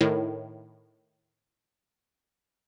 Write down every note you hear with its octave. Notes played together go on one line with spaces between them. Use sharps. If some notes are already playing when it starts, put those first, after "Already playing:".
A2 D#3